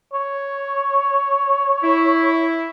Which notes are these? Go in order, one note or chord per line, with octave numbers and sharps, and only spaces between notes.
C#5
E4